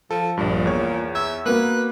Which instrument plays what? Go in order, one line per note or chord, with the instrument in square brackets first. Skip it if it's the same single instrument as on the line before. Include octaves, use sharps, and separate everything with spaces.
[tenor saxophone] F3 [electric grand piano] A4
[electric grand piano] A#1 G2 [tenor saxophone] A#2
[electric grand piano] E2 C#5
[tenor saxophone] E5 [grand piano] G#6
[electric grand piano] A#3 [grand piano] B3 F#4 A#4 [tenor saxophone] B4